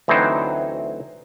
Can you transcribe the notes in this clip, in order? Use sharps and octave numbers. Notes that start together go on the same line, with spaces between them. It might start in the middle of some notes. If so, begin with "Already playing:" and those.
D2 E3 F#3 C4 D#4 C5